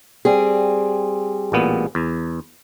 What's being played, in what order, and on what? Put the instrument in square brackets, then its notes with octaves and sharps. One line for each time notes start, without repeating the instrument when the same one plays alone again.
[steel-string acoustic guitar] G3 C4 G#4
[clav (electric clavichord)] A1 A#2 B3
E2